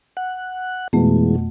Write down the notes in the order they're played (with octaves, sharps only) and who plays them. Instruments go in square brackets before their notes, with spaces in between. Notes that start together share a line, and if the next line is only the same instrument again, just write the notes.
[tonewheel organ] F#5
[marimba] F2 A3 [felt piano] B2 B3 [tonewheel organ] E3 G#3